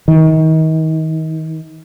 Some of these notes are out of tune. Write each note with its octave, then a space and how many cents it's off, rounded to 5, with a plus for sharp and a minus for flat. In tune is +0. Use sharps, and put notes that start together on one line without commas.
D#3 +35